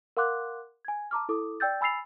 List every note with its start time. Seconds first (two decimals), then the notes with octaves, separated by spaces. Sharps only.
0.17 A#4 F5 F#5 C6 D6 F#6
0.85 G#5 G#6
1.11 A5 A#5 D6 F6
1.29 E4 A4 D6 D#6
1.60 D5 G5 E6 G6 A6
1.81 G#5 B5 E6 A6 C7 F7